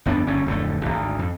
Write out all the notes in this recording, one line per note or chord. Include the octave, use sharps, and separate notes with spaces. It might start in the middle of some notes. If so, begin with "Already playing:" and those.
G1 F2 B3 D4
F#1 G2 D3 C#4
D1 F2 D3 A3
G#1 D2
F2